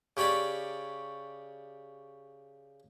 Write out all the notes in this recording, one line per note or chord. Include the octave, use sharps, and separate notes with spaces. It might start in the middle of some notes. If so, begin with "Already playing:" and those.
C#3 G4 C#5 D5 B5